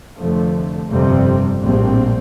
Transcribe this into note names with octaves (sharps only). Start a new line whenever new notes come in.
F1 F2 D3 F3 A3
G1 F2 C3 G3 C4
A#1 A2 G3 C4